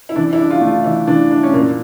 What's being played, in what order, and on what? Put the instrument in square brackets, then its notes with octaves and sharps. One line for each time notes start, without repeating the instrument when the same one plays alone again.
[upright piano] E4
[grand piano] E3 [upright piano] D4
[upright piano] E4
[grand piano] D4
[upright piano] F4
[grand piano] A3
[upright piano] F4
[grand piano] E3 [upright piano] E4
[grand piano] E3 [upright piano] D4
[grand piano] D4
[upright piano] C#4
[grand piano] A#2 [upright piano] A#3